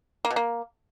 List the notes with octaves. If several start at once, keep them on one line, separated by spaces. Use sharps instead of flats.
A#3
B2
A#3